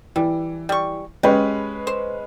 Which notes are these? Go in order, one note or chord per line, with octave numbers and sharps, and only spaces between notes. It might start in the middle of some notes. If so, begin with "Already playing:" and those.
E3 G3
G3 C#6
G#3 C#4 G4 B4
C5